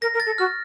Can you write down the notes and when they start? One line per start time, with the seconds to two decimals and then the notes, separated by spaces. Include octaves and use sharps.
0.02 A#4 A#6
0.14 A#4
0.20 A6
0.26 A4
0.38 F#4 F6